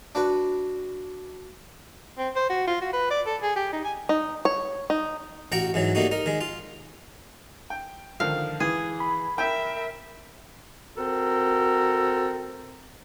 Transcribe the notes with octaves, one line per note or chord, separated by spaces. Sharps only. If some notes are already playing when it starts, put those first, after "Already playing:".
D4 F#4 B4
C4
C5
F#4
F4
F#4
B4
D5
A4
G#4
G4
D#4
G#5
D#4
C#5
D#4
A1 F#4 G5 A#5 C#6
G#2 E3 F#3
G3 A3 A#3 D#4 F#4
D#4 A#4
D#3 G#3
F4
G5
D3 D#3 F3 F5
E3 G#4
B5
A#4 E5 G5
C4 F#4 A4 A#4